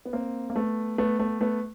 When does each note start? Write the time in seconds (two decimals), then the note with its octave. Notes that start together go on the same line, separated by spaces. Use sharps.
0.05 B3
0.13 A#3 C4
0.50 A#3
0.56 A3 B3
0.98 A3 B3
1.19 A3 B3
1.41 A3 B3